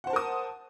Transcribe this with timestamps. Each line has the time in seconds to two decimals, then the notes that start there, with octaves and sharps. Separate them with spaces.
0.04 F#5
0.07 C5
0.10 A5
0.13 A#4
0.16 D#6